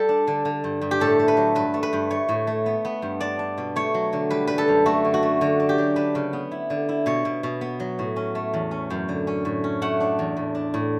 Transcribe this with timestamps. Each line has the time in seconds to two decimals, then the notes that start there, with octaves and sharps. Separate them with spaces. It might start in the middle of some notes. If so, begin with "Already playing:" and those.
Already playing: G3 A4
0.09 D4
0.27 D3
0.45 D3
0.64 G2
0.82 G2
0.91 G4
1.00 A2 A4
1.19 A3
1.28 B4
1.37 F#3
1.55 G2 B4
1.74 A3
1.83 B4
1.93 G2
2.10 A3 C#5
2.29 A2
2.47 A3
2.66 B3
2.85 B3
3.02 G2
3.20 D4 D5
3.39 D4
3.58 B2
3.76 A3 C#5
3.94 F#3
4.13 D3
4.31 G3 B4
4.47 G3 B4
4.58 A4
4.68 F#2
4.86 A3 F#4
5.05 D3
5.14 F#4
5.23 A3
5.41 D3 F#4
5.60 D4
5.69 G4
5.78 F#3
5.96 D4 B4
6.15 C#3
6.33 B3
6.52 E4
6.70 D3
6.89 E4
7.06 B2 C#5
7.25 B2
7.43 B2
7.61 B3
7.80 F#3
7.99 A2
8.16 C#4
8.35 A3
8.54 E2
8.71 C#4
8.91 F#2
9.09 D3
9.27 C#4
9.45 A2
9.64 C#4
9.82 A3 F#5
10.00 D4
10.19 E2
10.37 A2
10.55 D4
10.74 A2